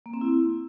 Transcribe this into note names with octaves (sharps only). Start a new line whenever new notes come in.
A#3
C4
E4